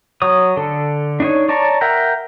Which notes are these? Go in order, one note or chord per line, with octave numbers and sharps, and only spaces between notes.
F#3 C#5 D#6
D3 A4
D4 D#4 C#5
C#5 D5 A5 A#5 C#6
A#4 E5 F#5 G5 A#5